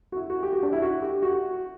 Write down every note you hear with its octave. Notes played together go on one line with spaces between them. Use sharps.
F#4
E4
F#4
G4
F#4
D4
E4
F#4
G4
F#4